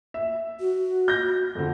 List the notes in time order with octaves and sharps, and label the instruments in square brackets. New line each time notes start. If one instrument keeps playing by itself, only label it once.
[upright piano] E5
[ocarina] F#4
[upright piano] G6 A#6
F2 D3